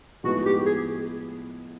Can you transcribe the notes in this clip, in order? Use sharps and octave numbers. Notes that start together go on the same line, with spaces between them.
A2 F3 G#3 B3 D#4 F#4
G4
G#4